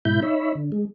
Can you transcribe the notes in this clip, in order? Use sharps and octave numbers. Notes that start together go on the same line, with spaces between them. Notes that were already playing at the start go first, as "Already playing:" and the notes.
G#2 B2 E4 B5 G6
D#4 C#5 E5 B5
D3
G#3